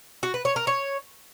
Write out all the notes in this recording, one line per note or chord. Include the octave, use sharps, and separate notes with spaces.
F#4
B4
C#5
A#4
C#5